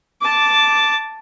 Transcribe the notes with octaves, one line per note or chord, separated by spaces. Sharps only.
A5 D6